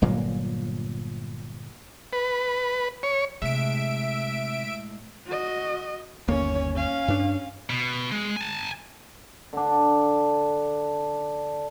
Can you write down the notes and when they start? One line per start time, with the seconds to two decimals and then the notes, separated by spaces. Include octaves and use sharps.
0.02 G1 A#2 F#3 A#3
2.13 B4
3.03 C#5
3.42 A2 C3 G#3 E5 D7
5.27 F#4 D#5
6.28 G1 D#2 A#3 C#4 C#5
6.75 C#4 F5
7.08 G2 D4
7.70 B2
8.12 G#3
8.36 G#5 A5
9.53 D3 D4